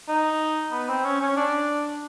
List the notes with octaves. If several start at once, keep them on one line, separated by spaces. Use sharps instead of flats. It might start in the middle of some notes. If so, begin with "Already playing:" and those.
D#4
B3
C4
C#4
C#4
D4